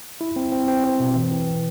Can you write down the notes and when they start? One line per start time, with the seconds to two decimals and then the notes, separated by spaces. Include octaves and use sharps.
0.21 E4
0.36 C4
0.52 C4
0.68 C4
0.84 C4
1.00 B2
1.15 E3
1.32 E3